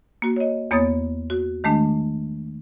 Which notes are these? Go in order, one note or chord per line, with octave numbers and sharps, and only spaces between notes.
A#3 F#4
C#5 D#5
E2 A#3 B3 C#5 D#6 A6
F#4
D#3 G#3 A3 D4